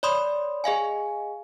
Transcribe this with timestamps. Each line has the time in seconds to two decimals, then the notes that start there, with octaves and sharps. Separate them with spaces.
0.03 C#5 D5 B5 C6 D#6
0.64 G#4 D#5 F5 G#5